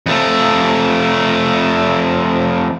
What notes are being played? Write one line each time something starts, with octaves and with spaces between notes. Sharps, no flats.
F2 A3